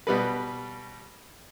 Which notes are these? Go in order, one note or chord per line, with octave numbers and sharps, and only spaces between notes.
B2 G3 B4